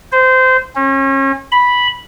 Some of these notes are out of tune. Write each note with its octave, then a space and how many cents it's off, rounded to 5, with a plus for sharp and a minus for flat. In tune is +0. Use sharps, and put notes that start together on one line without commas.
C5 -20
C#4 -35
B5 -5